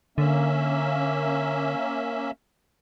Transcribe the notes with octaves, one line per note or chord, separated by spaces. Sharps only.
D3 A#3 C#4 E5